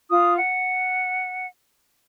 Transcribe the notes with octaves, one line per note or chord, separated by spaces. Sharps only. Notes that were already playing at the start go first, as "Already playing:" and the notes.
F4 D#6
F#5